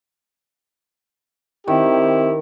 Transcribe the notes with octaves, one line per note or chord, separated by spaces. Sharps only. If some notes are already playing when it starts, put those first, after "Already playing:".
D#3 C4 E4 G4